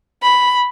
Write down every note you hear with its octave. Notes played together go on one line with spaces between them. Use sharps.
B5